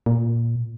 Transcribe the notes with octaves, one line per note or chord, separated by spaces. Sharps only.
A#2